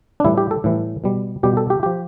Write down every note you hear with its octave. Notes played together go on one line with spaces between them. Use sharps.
D4
A2 E3 G3 E4
G4
A4
A2 E3 G3
B2 G3
B2 G3 G4
A4
G4
F3 G4